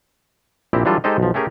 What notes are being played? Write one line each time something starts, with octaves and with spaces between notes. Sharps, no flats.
A#1 A#2 C4 E4 G4
E3 F#3 G3 D4 F4 A4
G#3 D#4 G4 A4 C5 D#5
B1 F3
A3 C#4 G4 G#4 A#4